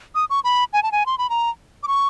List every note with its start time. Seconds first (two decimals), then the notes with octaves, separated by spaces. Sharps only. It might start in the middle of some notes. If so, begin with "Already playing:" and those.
0.15 D#6
0.30 C#6
0.44 B5
0.73 G#5
0.83 A5
0.92 G#5
1.06 C6
1.18 B5
1.30 A#5
1.83 D6
1.88 C#6